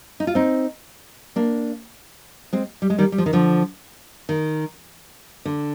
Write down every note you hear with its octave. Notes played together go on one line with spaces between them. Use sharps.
D#4
F4
C4 D#4
A#3 D4
G#3 C4
G3
G#3
D#3 G3
G3
F3
D#3
D3 F3
D#3
D3